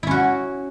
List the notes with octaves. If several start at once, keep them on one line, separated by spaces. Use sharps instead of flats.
C#4 E4 F#4